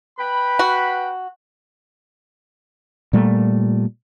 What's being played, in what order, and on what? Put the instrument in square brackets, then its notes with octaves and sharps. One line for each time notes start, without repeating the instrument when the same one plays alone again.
[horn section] B4 G5 B5
[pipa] F#4
[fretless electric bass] A#2 G3 A3